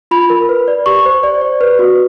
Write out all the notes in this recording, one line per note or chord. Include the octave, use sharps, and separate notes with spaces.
F4 B5
A#4
B4
D5
G4 C#6
C5
D5
D5
B4
F#4